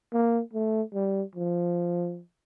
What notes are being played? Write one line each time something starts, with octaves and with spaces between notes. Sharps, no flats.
A#3
A3
G3
F3